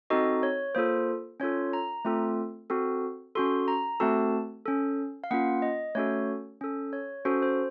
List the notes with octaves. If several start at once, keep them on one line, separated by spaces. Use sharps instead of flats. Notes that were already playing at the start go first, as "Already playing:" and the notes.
C4 D#4 F#4 A4 D#5
C#5
A#3 F4 A4 C5
C#4 F4 A4 C#5
A#5
A3 C4 F4 A4
C4 F#4 A4
C#4 F#4 A4 C6
A#5
A3 C4 F#4 A4 A5
C#4 A4
F5
A#3 C#4 F4 F#5
D#5
A3 C#4 F#4 A4 C#5
C#4 A4
C#5
C#4 F#4 A4 C5
C5